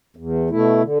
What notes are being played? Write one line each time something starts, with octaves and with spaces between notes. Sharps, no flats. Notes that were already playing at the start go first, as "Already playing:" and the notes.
E2
B2 A3 E4
D3